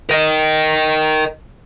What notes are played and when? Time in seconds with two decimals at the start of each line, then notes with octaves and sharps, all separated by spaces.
0.10 A#4 D#5